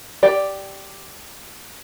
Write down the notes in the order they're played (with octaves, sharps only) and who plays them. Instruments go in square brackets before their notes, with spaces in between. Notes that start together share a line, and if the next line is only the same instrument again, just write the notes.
[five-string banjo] G4 D5